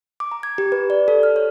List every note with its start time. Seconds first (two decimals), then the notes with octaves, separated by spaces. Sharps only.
0.20 D6
0.32 A#5
0.43 G#6
0.58 G4
0.72 B4
0.90 D5
1.08 A4
1.23 F6
1.36 C#5